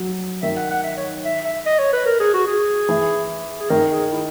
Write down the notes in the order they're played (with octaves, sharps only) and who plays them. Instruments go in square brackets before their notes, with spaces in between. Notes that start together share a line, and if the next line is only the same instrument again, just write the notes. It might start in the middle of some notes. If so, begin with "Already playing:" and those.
Already playing: [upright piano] F#3
[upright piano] D#3 [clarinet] E5
[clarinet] F#5
F#5
E5
C#5
E5
E5
D#5
C#5
B4
A#4
G#4
F#4
G#4
[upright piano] E3
[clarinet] G#4
[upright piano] D#3 [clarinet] A#4
[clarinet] G#4
E4